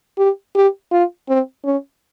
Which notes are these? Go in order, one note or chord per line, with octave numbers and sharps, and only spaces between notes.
G4
G4
F4
C4
C#4